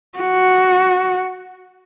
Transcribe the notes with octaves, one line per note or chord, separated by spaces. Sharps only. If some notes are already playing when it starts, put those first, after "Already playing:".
F#4